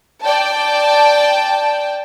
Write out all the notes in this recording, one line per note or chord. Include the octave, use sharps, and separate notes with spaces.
D5 G5 A5